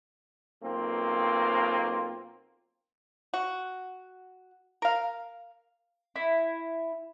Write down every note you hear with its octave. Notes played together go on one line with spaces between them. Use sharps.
B1 A#3 C4 F4
F#4
A#4 F5
E4